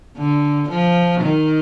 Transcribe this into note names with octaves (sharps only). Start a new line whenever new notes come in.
D3
F3
D#3